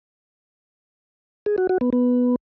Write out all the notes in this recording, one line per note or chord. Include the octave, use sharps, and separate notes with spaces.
G#4
F#4
F#4
B3
B3